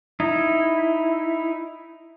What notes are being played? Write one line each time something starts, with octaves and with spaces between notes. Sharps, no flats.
D#4 E4